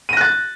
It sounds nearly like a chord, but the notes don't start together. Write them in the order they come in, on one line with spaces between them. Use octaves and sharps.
D#7 A#6 F#6 A6